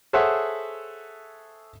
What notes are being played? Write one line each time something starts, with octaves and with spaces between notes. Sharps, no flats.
G#4 A4 C5 C#5 E5 F#5